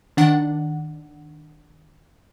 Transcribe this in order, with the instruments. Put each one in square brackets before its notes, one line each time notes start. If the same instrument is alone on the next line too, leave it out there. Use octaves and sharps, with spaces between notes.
[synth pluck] D#3 D4 F#5